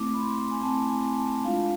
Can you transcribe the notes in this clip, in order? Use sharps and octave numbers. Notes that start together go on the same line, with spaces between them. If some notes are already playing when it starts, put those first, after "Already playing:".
Already playing: A3 C4 E4 D6
B5
C6
G#5
A3 C4 E4 A5
G#5
A5
G#3 D4 F4 F5